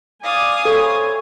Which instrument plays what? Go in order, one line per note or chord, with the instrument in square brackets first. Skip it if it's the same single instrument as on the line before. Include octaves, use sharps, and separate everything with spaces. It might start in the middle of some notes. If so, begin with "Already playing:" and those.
[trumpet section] D5 [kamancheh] F5 D#6 [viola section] G#5
[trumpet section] C4 E4 C#5 [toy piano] A4